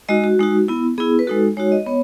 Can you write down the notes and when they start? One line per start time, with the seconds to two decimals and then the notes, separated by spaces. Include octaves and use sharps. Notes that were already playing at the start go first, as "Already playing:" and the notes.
0.09 G#3 D#4 F#4 D#5
0.24 F#4
0.39 G#3 D#4 F#4
0.68 B3 E4
0.98 B3 E4 G#4
1.19 B4
1.27 G#3 D#4 F#4 A4
1.57 G#3 D#4 F#4 C#5
1.72 D#5
1.86 B3 C#5